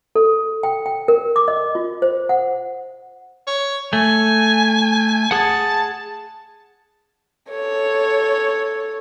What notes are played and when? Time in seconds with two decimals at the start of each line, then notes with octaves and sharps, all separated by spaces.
0.16 A4
0.63 G5
0.86 G5
1.08 A#4
1.36 D6
1.48 D#5
1.75 F4
2.02 C5
2.29 F#5
3.47 C#5
3.93 A3 G#5
5.31 G#4 F#5 A5
7.50 A4 C#5